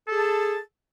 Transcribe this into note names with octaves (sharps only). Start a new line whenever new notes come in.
G#4 A4 A5